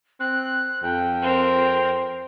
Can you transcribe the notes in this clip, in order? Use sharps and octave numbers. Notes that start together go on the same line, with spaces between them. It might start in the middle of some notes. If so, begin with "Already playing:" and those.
C4 F#6
F2 G5
C4 A#4